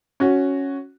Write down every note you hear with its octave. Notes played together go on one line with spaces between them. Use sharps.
C#4 F#4